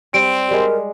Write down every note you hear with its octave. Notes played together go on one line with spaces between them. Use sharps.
G3 C4 D7
G3 G#3 A#4